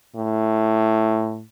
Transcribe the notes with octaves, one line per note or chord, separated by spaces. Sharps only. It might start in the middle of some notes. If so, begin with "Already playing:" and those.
A2